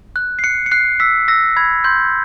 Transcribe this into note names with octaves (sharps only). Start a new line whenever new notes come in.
F#6
C7
F#6 C#7
C#7
F#6 C7
E6 B6
E6 A#6
B5 G#6
C6 G6